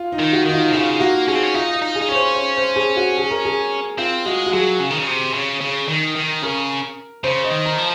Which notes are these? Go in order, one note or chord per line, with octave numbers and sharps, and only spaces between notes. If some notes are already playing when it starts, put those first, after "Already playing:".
Already playing: F4
D#4
D#3
F#4
D#3 D#4
F4
C3
C#3 F4
A#3 F#4
C#4 G#4
C4
C#4
D#4 F4
F4
D#4
G#4
D#4
C#4 C#5
C5
C#5
C5
G#4
F#4
G#4
A#4
G#4
C4 F4
G#3 F#4
F#4
F#3 G#4
C#3
D#3
C#3
C3
C#3
C#3
D#3
D#3
C#3 A#4
C#3 C5
D#5
D#3
A#5
F3